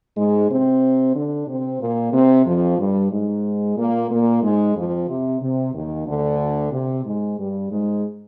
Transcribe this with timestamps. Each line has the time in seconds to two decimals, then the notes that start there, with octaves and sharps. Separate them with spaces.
0.16 G#2 G#3
0.50 C3 C4
1.15 D3 D4
1.48 C3 C4
1.81 A#2 A#3
2.13 C3 C4
2.46 F2 F3
2.79 G2 G3
3.11 G#2 G#3
3.77 A#2 A#3
4.10 A#2 A#3
4.43 G#2 G#3
4.75 F2 F3
5.09 C3
5.41 C3
5.73 D#2 D#3
6.06 D2 D3
6.71 C3
7.05 G#2 G#3
7.38 G2 G3
7.71 G#2 G#3